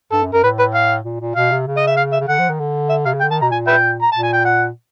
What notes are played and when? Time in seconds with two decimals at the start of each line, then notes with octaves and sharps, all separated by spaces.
0.12 G2 A4
0.23 F#2
0.33 F#2 A#4
0.43 A2 B4
0.59 B4
0.75 F5
1.05 A#2
1.20 A#2
1.36 B2 F5
1.51 C3
1.67 C#3
1.77 D#5
1.88 E5
1.97 F5
2.13 E5
2.20 C#3
2.28 D3 F#5
2.39 F3
2.49 D#3
2.59 D3
2.89 E5
3.05 C3 F5
3.14 C#3
3.21 D3 G5
3.31 D#3 A5
3.42 B2 A#5
3.51 A#2 G#5
3.67 B4 E5 G5
4.02 A#5
4.12 A#2 A5
4.23 G#5
4.33 G5
4.45 F#5